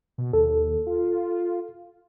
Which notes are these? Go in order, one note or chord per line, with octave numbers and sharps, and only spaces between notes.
B2
D#2 A4
F4